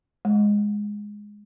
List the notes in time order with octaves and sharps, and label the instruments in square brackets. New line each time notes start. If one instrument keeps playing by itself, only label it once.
[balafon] G#3